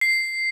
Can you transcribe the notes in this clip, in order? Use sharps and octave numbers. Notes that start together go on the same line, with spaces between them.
C7